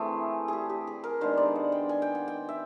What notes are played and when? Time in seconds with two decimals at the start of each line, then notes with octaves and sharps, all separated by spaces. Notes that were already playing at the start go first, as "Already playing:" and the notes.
Already playing: E3 A3 C4 G#4
0.48 G4 G#4
0.70 G4
0.87 G#4
1.04 A#4
1.21 D#3 G#3 B3 D4 C5
1.37 D5
1.56 F#5
1.72 G5
1.89 G#5
2.02 G5
2.15 F#5
2.28 G5
2.49 E5